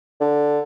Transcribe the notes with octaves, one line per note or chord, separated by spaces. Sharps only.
D3